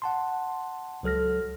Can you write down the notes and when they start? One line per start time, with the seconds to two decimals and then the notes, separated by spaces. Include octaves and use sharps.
0.02 F#5 A5 C6
1.03 C#2 F#3 A4 F6 A#6